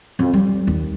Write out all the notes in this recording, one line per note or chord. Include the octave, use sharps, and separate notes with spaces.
F2
G3
D#2